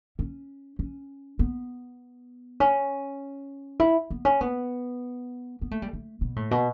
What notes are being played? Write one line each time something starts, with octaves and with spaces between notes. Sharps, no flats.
C#4
C#4
B3
C#4
E4
B3
C#4
B3
B3
A3
G3
A3
B2
A2
B2